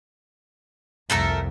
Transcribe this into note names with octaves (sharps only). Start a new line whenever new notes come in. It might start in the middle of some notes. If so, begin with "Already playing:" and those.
C2 F2 A3 A4 A#4